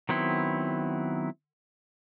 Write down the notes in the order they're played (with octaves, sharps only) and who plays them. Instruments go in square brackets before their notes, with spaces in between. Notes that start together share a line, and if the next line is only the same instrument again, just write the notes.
[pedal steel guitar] D#3 F#3 B3 C4 E4